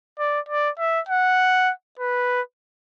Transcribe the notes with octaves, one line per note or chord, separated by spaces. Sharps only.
D5
D5
E5
F#5
B4